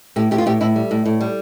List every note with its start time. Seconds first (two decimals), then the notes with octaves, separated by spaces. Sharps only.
0.16 A2 G4
0.31 A2 G4
0.38 F4
0.46 A2 G4
0.61 A2 E4
0.76 G3
0.91 A2
1.06 A2
1.21 G3